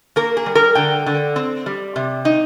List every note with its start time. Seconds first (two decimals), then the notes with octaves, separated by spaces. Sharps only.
0.16 A#3 A#4
0.37 G#4
0.46 G3
0.55 A#4
0.75 D3 G5
1.06 D3
1.36 C4
1.66 G3
1.96 C3
2.25 D#4